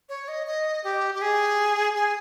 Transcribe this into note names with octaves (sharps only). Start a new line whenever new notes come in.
C#5
D#5
D#5
G4
G4
G#4
G#4